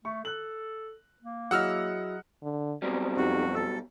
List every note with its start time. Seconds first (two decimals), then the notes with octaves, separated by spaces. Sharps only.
0.05 A3 C#6
0.25 A4 F#6 F#7
1.22 A#3
1.51 F#3 E4 G#4 D#5 F#5 E6 F6
2.43 D3
2.82 B2 F#3 G3 C4
3.17 F2 C4 D#4 F#4 G4
3.55 A4 E6